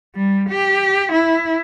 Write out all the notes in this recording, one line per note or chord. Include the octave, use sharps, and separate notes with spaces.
G3
G4
E4